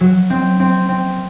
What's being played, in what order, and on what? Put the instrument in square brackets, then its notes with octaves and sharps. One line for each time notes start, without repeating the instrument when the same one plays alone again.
[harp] F#3
C4
C4
C4